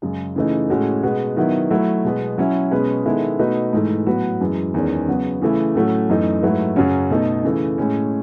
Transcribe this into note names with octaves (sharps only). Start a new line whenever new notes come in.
F#2 C#3 G#3
C#3 E3 A3 D#4
A2 G#3 C#4 F#4 A4
B2 G#3 B3 F#4
D#3 F#3 B3 E4
F#3 A3 E4
B2 G#3 B3
F#3 C#4 E4
B2 G#3 C#4 G#4 B4
D#3 G#3 B3 E4 A4
B2 A3 D#4 F#4 B4
G#2 E3 A3
A2 F#3 B3 F#4 B4
F#2 E3 G#3
E2 D#3 G#3 C#4
C#3 F#3 B3
C#3 E3 A3 E4
A2 F#3 A3 C#4 F#4
F#2 E3 A3 D#4
G#2 F#3 A3 E4 B4
F#2 C#3 F#3 C#4
B2 A3 D#4 A4
C#3 E3 A3
A2 G#3 C#4